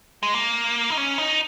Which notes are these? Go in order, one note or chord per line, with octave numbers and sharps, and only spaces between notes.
G#3
A#3
D#4
C#4
D#4